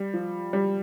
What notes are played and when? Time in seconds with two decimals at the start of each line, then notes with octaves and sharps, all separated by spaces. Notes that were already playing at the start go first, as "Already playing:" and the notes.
Already playing: G3
0.14 F3
0.53 G3